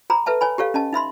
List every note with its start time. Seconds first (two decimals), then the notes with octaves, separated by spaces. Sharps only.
0.10 G#4 A#5 B5
0.26 A4 B4 E5 A5
0.41 C#5 G#5 B5
0.58 G4 A4 C#5 F5
0.74 C#4 D#5 A5
0.93 D#4 E5 B5 C6